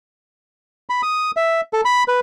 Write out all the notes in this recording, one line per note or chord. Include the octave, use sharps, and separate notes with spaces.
B5
D#6
E5
A4
B5
B4